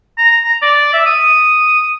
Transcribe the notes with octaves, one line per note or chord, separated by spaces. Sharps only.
A#5
A#5
D5
E5
D#6